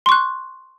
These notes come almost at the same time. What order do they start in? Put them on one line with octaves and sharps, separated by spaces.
C6 C#6 F#6